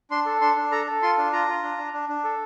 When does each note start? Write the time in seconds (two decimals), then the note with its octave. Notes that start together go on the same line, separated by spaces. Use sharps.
0.11 D4 C6
0.26 A4
0.41 D4 C6
0.56 D4
0.72 A4 A#5
0.87 A4
1.02 F4 C6
1.17 D4
1.33 F4 A#5
1.48 F4
1.63 D4
1.78 D4
1.93 D4
2.09 D4
2.24 A4